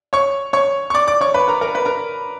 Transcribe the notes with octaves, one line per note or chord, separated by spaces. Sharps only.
C#5 C#6
C#5 C#6
C#6
D5 D6
D5 D6
C#5 C#6
B4 B5
A#4 A#5
A#4 A#5
B4 B5
A#4 A#5